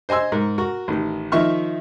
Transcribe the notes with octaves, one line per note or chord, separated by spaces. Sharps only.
C5 D#5 G#5 C6 E6
G#2 A#4
F#4 A#4
A1 D#3
D#3 F3 D#5 E5 C#6 F6